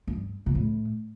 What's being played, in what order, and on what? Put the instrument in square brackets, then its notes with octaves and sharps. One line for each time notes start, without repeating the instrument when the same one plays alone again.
[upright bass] G2
B2
A2